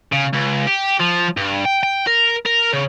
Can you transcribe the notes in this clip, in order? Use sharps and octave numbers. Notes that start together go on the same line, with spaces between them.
C#3
C#2
G4
F3
G2
G5
G5
A#4
A#4
C#3